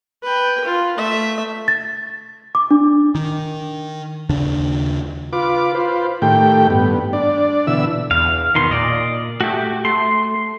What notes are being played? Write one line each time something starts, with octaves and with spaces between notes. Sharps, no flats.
B4 G5
F4
A3 E5
A6
D6
D4
D#3
D#2 C#3 D4
F4 B4 D6
F4 B4 C5
A2 D#3 A3 G4 G5
G2 B3
D4 D5
B2 D3 E3 E5 E6
E2 F5
B2 D#3 C6
A#2 D5 D#5
A3 F#4 G4
A3 C6